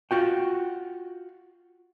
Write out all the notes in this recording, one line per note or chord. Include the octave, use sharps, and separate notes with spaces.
F4 F#4 G5